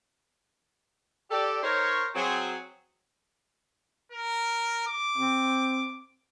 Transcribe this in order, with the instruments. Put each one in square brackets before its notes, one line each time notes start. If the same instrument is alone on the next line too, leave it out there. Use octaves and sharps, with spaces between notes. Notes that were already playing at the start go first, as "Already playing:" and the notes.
[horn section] G4 A4 D5
D#4 A#4 C5 C#5
F#3 C4 G#4
[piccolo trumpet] A#4
D6
[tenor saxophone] C4